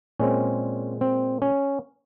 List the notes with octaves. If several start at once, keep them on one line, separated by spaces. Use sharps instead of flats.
A#2 G#3 C4 C#4
C4
C#4